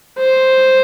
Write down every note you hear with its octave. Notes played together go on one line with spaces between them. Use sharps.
C5